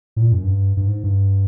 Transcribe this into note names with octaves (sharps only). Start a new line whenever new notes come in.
A2
A#2
F#2
G2
G2
G#2
G2